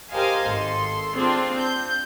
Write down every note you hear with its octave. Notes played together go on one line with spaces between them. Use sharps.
G4 A#4 C5 D#5 F5 G#5
G#1 A4 C6
C4 D4 F4 G#4 C6
G6